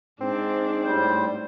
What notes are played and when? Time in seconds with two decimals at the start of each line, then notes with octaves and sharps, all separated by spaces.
0.21 G#2 C4 D4
0.85 A2 G3 C5